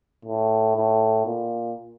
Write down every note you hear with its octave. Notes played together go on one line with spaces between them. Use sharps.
A2
A2
A#2